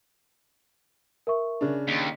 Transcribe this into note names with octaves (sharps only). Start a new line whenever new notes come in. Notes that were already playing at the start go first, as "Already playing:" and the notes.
A#4 E5 C#6
C#3 D4
D#2 B6